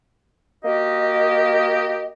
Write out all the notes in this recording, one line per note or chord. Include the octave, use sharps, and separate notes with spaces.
A#3 F#4 G4 D#5